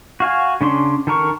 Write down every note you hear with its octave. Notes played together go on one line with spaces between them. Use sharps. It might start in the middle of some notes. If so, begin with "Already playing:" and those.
F#4 F5 G#5
C#3 C#4 D4 C6
D#3 A4 A#4 C#6